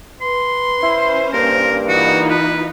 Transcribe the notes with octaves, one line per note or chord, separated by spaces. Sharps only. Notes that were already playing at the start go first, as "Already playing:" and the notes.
B4 C6
C#4 E4 C5
G2 A#3 A#4
E3 D#4 F4 F#4
B4